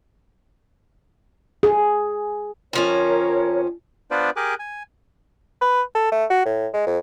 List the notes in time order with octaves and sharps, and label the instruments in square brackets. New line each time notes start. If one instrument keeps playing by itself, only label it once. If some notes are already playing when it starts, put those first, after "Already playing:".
[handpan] G#4
[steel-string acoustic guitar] F2 F3 C#4 [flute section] A#4 C#5
[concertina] B3 D4 F4 B4 C5 D5
G4 G#4 A#4 G#5 D6 F#6
G#5
[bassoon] B4
A4
A3
F#4
A2
G#3
F2